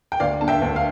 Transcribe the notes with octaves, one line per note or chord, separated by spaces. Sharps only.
G5
D2 D5 F5
D3 A5
E5 G5
D2
F5